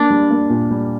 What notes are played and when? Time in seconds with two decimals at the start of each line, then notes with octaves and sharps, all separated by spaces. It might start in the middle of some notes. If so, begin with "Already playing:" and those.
Already playing: A#3 D4
0.10 G3
0.31 A#3
0.50 A#2
0.71 G3